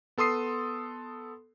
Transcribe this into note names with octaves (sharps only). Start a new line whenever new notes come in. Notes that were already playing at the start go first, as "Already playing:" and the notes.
B3 A4 C6 D#6 C7